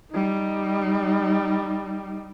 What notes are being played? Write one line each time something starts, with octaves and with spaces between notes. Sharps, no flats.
G3 D#4